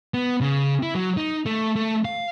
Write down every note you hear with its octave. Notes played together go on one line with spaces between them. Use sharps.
B3
C#3
E4
F#3
D#4
A3
A3
F5